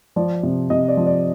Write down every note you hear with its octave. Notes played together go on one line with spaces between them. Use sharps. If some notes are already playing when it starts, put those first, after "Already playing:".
F3 D5
C3
C3 D#5
D5
F3
D5